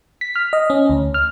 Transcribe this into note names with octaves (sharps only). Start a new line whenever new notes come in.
B6
F6
D#5
C#4
D2
F6